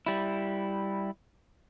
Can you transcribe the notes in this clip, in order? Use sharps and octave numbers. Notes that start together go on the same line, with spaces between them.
G3 E4